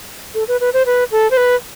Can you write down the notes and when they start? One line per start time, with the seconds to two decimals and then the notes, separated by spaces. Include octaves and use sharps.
0.35 A4
0.48 B4
0.61 B4
0.74 C5
0.86 B4
1.12 A4
1.31 C5
1.37 B4